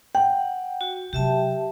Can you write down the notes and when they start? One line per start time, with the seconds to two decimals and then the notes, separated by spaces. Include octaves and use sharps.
0.15 F#5 G5
0.81 F#4
1.13 C3 F#3 G4 E5 A5